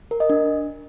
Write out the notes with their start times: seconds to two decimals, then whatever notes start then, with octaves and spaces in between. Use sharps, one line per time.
0.11 A#4
0.20 D#5
0.30 D4